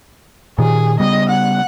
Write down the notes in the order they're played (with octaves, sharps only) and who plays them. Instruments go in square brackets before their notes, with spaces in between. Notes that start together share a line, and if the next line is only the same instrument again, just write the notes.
[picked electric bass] A#2 D#3 [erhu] G#4
[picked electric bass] C#3 G3 B3 [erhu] D#5
[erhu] F#5